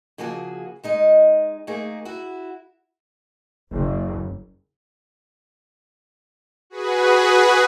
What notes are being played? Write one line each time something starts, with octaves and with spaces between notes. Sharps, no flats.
C#3 F3 A#3 F#4 G#4
G#3 D#4 D#5
A3 A#3 D#4 G#4 A#4
E4 F#4
F#1
F#4 G#4 B4